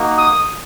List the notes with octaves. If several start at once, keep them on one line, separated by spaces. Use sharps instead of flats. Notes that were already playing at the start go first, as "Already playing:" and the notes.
Already playing: A#3 D#4 F#4
D#6